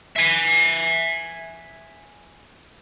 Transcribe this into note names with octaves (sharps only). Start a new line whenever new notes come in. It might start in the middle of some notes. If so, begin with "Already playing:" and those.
E5 G#5